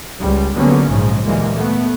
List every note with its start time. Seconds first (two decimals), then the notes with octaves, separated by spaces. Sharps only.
0.19 C#2 G3
0.56 D3 F#3 G3 A#3 B3 C#4
0.88 A#1 G#2 C#3 F3 F#3
1.24 D2 A#2 E3 G3 G#3 A#3
1.54 A3 B3